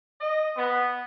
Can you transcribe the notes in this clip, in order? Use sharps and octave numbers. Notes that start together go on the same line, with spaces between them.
D#5
B3